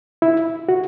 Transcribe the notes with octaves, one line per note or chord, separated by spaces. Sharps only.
E4
F#4